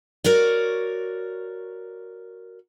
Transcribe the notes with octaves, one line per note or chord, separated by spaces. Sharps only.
F#4 A#4 C#5 D5